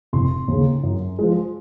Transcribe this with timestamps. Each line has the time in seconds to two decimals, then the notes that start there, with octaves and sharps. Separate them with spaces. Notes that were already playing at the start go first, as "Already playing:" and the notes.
0.13 F1 C6
0.48 D#2 C#3
0.83 F#2
1.19 F3 G#3